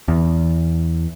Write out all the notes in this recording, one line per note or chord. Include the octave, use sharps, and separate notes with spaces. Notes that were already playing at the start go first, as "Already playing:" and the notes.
E2